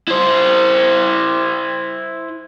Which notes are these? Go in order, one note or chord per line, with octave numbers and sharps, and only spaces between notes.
E4 C5